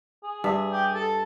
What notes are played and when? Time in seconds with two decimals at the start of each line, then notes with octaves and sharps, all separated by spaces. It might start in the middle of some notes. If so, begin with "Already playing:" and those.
0.23 G#4
0.44 G2 E5
0.71 G4
0.94 A4